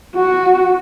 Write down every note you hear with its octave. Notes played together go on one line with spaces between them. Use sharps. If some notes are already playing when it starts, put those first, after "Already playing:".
F#4